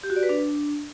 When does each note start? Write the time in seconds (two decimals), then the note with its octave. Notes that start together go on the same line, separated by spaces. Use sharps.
0.03 G4
0.10 F#4
0.16 D5
0.23 B4
0.29 D4